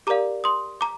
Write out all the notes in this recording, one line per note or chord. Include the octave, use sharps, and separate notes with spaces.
G4 A#4 D5 F5 A#5 D6
C6 D#6
A#5 D6